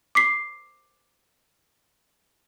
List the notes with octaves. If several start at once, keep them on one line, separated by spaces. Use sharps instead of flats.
D6 B6 C7